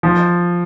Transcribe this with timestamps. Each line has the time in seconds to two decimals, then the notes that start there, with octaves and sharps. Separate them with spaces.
0.03 F3